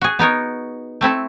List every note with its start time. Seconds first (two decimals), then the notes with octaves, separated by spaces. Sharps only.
0.01 F#4 G#4
0.19 B3 D#4 A#4 C#5
1.01 A3 C4 E4 A4